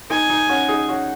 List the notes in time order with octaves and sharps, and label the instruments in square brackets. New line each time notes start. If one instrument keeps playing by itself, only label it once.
[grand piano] D#4 [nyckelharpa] G#5
[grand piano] D#4
C#4 F#4
D#4 G#4
C#4 F#4